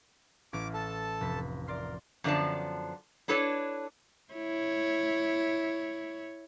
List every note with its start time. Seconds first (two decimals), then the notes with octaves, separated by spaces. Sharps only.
0.53 A1 C#4 D6 F6
0.74 A4 A5
1.21 F1 B5 B6
1.67 A#4 D5 C6 C7
2.24 F#2 D3 F3 B3 D5 A5
3.28 D4 E4 A4 B4 C#5
4.33 E4 C#5